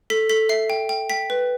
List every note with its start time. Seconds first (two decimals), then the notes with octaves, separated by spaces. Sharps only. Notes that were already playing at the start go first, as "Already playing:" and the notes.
0.10 A4 B6
0.29 A4 B6
0.49 E5 C7
0.70 G5
0.89 G5
1.10 G5 B6
1.30 B4